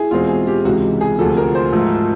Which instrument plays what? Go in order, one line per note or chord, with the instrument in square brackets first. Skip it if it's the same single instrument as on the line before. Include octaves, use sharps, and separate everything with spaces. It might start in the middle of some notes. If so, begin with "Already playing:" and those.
Already playing: [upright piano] E4 G#4
[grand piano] E2 B2 G#3 C4 [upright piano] F4
[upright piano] G#4
G4
[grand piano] C#2 C3 E3 G#3 [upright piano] F#4
[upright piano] G#4
[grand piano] D2 C3 F3 [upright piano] A4
[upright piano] A#4
C5
[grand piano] G#2 F3 A3